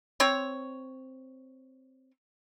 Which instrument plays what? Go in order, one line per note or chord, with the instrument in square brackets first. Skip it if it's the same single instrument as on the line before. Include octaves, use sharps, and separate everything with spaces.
[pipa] C4 C#5